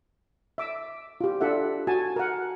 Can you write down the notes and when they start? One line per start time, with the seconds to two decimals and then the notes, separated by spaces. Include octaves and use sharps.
0.58 E5 D6 E6
1.21 F4 G4
1.41 D4 F4 A4 E5 F#5
1.87 F#4 G#5 A5
2.16 A#4 F#5